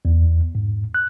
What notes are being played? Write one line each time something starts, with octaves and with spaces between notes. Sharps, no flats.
E2
G#2
F#6